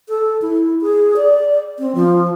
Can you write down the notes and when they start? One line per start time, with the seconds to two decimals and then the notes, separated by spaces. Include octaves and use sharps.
0.09 A4
0.42 E4
0.81 G#4
1.16 D5
1.79 C4
1.95 F3